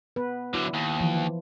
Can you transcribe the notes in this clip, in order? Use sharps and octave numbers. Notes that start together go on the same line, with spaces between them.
B3 B4
D3 F#3 E4
D#2
E3 F3